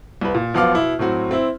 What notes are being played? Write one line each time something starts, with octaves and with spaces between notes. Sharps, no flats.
C2 B4
A#2
B1 F3 B3 F5 D6 F6
B2 E4
A2 F#3 C4 F#4
C4 E4